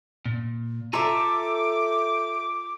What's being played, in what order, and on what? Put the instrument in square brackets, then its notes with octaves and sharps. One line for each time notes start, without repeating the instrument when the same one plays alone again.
[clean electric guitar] A#2
[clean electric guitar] F4 A#5 C6 [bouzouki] A4 E5 [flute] D6